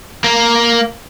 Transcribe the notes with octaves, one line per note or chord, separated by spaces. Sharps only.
A#3